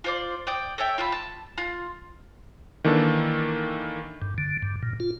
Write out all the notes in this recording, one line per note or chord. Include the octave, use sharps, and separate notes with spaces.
F4 C5 D5
D5 G5 D#6
A4 C#5 E5 G5
F4 A5 B5
A5
F4
D#3 E3 A#3 D4 A4
G2
D3
G2
A#2
F4